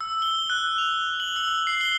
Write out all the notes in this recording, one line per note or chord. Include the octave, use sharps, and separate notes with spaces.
E6
G7
F#6
F7
F#7
E6
C7
G7